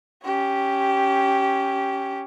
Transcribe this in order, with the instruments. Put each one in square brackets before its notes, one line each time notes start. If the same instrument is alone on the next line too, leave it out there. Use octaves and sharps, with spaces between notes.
[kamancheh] C#4 G4